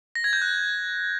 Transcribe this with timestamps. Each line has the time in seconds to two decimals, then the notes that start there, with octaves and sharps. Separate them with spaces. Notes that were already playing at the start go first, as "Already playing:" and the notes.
0.15 A#6
0.24 G#6
0.33 G6
0.42 F#6